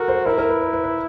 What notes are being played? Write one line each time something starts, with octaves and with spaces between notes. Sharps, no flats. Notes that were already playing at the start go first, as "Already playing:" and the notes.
Already playing: F#4 A4 A#4
C5
E4 A#4
A#4
B4
B4
B4
B4